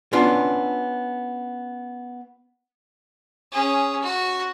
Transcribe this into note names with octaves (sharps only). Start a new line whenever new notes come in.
B3 C#4 D4 F4
C#4 G#4
F#4